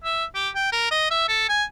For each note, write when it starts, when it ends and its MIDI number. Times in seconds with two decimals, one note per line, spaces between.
0.04 0.25 76
0.35 0.49 67
0.55 0.71 79
0.72 0.87 70
0.91 1.06 75
1.11 1.26 76
1.28 1.47 69
1.49 1.64 80